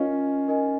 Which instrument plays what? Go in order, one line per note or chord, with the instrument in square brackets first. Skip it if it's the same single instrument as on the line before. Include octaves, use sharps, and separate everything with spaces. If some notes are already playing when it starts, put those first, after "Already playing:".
Already playing: [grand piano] C#4 F4 [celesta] D#4 A#4 D#5 G#5
[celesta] D#4 A#4 D#5 G#5